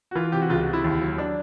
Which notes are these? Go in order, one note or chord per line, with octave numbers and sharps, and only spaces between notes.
F#4
E3 F4
C3 G4
F#4
C#2 F4
F#4
C3
E4
D#2
F#3
D4